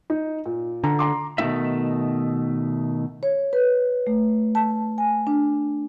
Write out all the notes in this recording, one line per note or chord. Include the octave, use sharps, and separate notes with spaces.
D#4
A#2
D3 A#5
A#5 C6 D6
B2 D#3 A3 C4 E4 E5
C#5
B4
A3
A5
G#5
D4